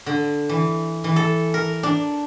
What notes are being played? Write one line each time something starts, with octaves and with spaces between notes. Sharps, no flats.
D3
E3
E3
A4
A#4
D4